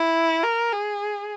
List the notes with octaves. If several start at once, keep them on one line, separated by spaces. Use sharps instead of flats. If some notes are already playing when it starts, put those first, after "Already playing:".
Already playing: E4
A#4
G#4